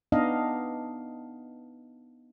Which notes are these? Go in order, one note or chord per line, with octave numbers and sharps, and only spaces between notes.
B3 D4 D#4 D#5 F5